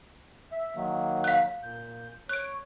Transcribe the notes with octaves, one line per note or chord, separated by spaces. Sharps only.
E5
D#3 F#3 A#3
F5 F#6
A#2 G6
C#5 F#6 D7